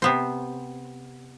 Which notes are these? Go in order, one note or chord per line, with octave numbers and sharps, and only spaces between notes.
C3 B3 C5